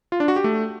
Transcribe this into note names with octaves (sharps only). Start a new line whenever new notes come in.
F4
D4
F#4
G4
A3